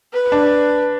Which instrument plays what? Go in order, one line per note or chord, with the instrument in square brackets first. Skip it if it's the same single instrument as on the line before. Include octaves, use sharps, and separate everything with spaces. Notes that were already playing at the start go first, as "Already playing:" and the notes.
[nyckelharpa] B4
[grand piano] D4